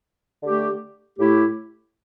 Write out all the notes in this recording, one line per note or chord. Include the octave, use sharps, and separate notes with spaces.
D3 A3 G4
A2 A3 E4 G4